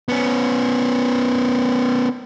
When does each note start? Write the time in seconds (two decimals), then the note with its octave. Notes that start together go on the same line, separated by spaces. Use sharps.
0.09 B3 C#4